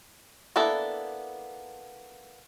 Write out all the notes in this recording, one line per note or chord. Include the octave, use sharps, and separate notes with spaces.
A#3 B3 D4 E4 A4